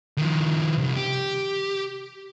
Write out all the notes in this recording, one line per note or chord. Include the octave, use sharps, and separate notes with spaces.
D#3 F3
C2
G4